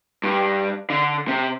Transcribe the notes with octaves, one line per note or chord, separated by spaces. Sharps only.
G2
D3
C3